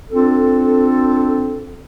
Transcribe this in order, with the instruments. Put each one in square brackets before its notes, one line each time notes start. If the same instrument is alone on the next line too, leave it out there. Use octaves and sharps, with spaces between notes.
[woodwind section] C4 D4 F4 A4